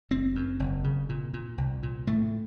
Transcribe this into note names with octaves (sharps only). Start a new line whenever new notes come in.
F#1 C4
F#2
F#1
C#3
A#2
A#2
C2
A#2
A2 A3